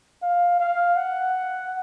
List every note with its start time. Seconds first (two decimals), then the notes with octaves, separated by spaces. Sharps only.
0.23 F5
0.60 F5
0.96 F#5